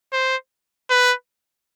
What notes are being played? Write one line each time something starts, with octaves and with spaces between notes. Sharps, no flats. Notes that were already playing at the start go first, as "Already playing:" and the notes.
C5
B4